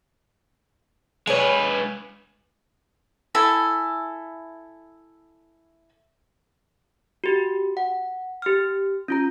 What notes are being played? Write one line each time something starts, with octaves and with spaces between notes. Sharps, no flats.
G#3 G#4 B4 C#5
E4 A4 G#5
F#4 G4
F#5
G4 F6
C#4 F4 A#5